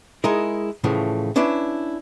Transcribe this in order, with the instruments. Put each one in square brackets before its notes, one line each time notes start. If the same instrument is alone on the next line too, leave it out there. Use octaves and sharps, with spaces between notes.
[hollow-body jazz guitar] G#3 D#4 E4 G#4 A#4
A2 C#3 E3 F3 A3
C#4 D4 E4 B4 D5